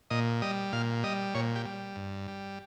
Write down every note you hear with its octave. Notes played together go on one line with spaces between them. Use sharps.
A#2 D#5
G3 D#5
A#2 F5
G3 D#5
A#2 C#5
G4
G3
G2
G3